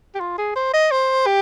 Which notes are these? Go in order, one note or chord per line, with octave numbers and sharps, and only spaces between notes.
G4
F4
G#4
C5
D#5
C5
G4